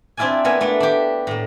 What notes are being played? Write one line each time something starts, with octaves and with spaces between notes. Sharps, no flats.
C4 D4 E4 F4 D5 G#5
A#3 B3 A#4 G#5
A3 B3 D4
D4 G4
A2 A#3